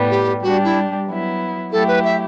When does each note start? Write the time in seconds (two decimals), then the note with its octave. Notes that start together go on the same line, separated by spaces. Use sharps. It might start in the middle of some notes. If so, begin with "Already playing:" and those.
Already playing: A2 G3 B3
0.10 G4
0.43 G3 D4 F#4 G4
0.64 E4
1.07 F#3 B3 E4
1.72 F#3 A3 E4 G4 A4
1.88 B4
2.04 E5